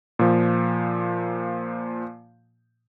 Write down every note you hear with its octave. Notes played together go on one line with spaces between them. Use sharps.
A#2 F3